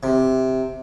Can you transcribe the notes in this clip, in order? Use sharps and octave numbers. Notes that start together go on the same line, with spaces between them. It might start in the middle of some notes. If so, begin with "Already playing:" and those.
C3